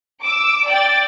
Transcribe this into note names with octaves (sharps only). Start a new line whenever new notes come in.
D6 E6
D5 G5 A6